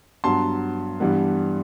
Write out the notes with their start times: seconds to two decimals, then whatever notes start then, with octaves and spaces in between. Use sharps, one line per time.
0.24 G2 F#3 B3 A5 C6
1.00 G2 E3 G3 B3